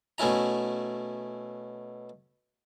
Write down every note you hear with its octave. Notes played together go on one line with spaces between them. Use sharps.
B2 A3 C#4 E4 A#5